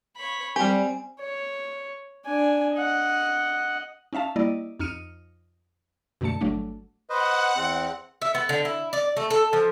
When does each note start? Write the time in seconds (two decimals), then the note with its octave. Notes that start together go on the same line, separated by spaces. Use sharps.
0.16 C#5 B5
0.56 G3 C4 G4 G#5
1.20 C#5
2.26 D4 G#5
2.75 D#5 F#5
4.13 C#4 D#4 E5 F5 A5
4.36 G3 A#3 E4 D5 D#5
4.80 F2 D#4 F6 C#7 D#7
6.21 F#2 B2 D3 A3 A5 C#7
6.41 G1 F#3 A3 D4
7.10 B4 C5 D#5 F#5
7.56 E2 C4
8.22 E5
8.35 B3
8.49 D3
8.65 E4
8.93 D5
9.17 A3
9.30 A4
9.53 F3